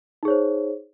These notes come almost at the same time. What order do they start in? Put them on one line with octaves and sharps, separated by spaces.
D#4 G#4 C#5 C5